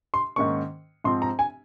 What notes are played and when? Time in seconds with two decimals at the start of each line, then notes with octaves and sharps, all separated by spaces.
0.14 C6
0.36 G#2 D#3 A#3 C#4 C#6
1.04 G#2 F3 C4 C6
1.22 A#5
1.39 G#5